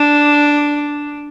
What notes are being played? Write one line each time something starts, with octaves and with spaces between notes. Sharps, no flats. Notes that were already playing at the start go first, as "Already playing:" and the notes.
Already playing: D4